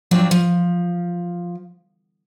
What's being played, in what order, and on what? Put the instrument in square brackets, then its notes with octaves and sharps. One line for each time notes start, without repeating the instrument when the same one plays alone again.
[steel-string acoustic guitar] F3 F#3 C4 D4
F3